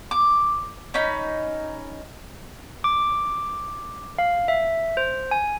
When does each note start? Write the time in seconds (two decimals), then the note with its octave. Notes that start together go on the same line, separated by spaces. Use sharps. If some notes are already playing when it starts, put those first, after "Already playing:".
0.11 D6
0.94 C#4 D#4 B5
2.84 D6
4.18 F5
4.48 E5
4.97 C5
5.31 G#5